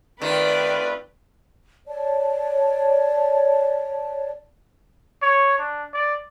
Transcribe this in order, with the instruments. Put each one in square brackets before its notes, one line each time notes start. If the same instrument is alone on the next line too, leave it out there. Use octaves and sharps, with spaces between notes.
[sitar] D#3 [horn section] A3 C4 F4 [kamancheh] B4 [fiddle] D5
[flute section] C#5 D5 A5
[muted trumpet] C#5
D4
D5